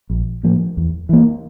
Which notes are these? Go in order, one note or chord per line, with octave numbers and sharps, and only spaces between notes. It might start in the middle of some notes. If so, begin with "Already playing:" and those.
A#1
A2 F3 A#3
E2
E3 A#3